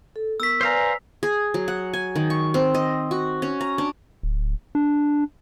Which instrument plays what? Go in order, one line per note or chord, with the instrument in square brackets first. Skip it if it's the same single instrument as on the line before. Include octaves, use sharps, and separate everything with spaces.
[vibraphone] A4
[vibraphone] B3 A#4 C#6 [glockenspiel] E6 B6
[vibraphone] B4 D5 G#5 [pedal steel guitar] C5 F5 A#5
[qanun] G#4
F#3
F#5
G#5
D#3
C#6
C4
D#5
F#4
C#4
A#5
D4
[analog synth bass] D1
D4